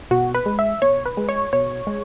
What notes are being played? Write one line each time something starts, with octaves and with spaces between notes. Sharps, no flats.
B2 F#4
B4
G#3
E5
B2 C#5
B4
G#3
C#5
B2 C#5
G#3